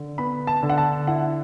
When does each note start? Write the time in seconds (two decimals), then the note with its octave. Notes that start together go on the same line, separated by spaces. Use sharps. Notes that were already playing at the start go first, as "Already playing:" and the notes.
Already playing: D3
0.18 B3 B5
0.47 A5
0.63 D3
0.69 F#5
0.78 A5
1.07 E4 F#5